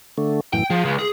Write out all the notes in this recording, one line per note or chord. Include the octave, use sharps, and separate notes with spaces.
D3 A3
F#2 A2 E3 G5
F3 G#4
C#2
G#4